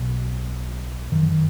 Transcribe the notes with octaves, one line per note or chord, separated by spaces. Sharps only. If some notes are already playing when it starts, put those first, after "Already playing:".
Already playing: B1 B2
G1 F#2 D#3
E3
D#3